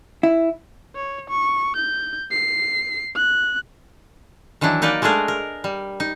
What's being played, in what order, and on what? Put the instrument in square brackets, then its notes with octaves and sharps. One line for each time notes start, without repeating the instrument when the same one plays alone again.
[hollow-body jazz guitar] E4
[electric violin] C#5
C#6
G6
C7
F#6
[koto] D#3 E3 F#3 D4 E4
A#3 D#4 A#4 B4 D5
G#3 A3 D4 G#4 A#4
A#4
G3
D#4